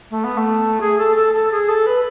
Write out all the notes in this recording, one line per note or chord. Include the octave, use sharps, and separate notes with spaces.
A3
B3
A3
G#4
A4
A4
A4
G#4
A4
B4